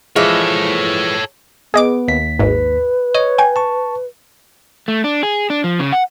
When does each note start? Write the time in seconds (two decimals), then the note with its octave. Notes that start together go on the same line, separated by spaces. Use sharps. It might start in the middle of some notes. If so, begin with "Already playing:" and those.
0.16 E3 F3 G#3 A4 C#5
1.74 B3 G#4 D#5 D6
2.08 D#2 B6
2.39 G#1 G#2 B4
3.15 C#5 D#5
3.38 G5 G#5
3.56 A5 C#6
4.88 A3
5.04 D4
5.23 G#4
5.50 D4
5.64 F3
5.80 C#3
5.92 F#5